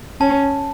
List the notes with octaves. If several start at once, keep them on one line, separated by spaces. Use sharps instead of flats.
C#4 A5